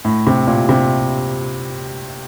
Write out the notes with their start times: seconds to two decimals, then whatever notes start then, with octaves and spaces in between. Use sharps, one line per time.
0.05 A2
0.27 C3
0.47 A#2
0.69 C3